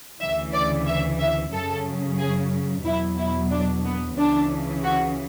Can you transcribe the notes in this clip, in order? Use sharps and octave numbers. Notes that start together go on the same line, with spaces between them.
D2 C#3 E3 E5
D5
E5
E5
F#2 C#3 F#3 A4
G#4
E2 B2 F#3 E4
E4
D4
B3
C#2 C#3 E3 D4
F#4